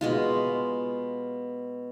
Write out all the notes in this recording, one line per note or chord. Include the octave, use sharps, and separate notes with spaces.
B2 G#3 F4